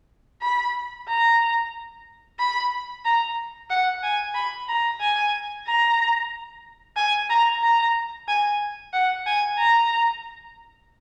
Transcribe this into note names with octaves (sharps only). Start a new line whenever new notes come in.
B5
A#5
B5
A#5
F#5
G#5
B5
A#5
G#5
A#5
G#5
A#5
A#5
G#5
F#5
G#5
A#5